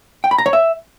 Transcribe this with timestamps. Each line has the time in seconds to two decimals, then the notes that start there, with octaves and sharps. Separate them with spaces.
0.24 G5
0.31 B5
0.38 A#5
0.46 C#5
0.53 E5